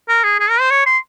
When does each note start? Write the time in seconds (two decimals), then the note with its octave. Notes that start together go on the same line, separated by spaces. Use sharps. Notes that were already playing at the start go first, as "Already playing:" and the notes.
0.09 A#4
0.24 G#4
0.40 G#4
0.50 A#4
0.60 C5
0.71 C#5
0.86 C6